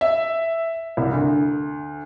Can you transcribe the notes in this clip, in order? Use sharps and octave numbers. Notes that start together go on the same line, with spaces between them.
E5
C2
D2